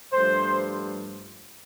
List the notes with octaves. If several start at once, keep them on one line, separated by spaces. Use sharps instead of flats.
G2 F3 A3 C5